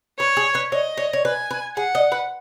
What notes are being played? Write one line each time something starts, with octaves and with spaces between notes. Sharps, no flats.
B4 C#5
G#4
B4
C#5 D#5
C#5
C#5
B4 G#5
B4
G#4 F#5
D#5
B4